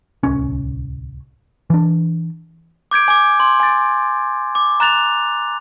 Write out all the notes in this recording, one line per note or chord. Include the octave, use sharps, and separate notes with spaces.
D1 C2 C#4
E3 D4
D6 G6 G#6 D7
G#5 D6
C6
G#5 A6
D6
A#5 F#6 A6 F7